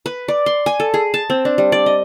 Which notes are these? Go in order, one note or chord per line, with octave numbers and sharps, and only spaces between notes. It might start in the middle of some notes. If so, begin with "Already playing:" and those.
B4
D5
C6
G#5
A4
G#4
A5
C4
D4
G3
D5
D#5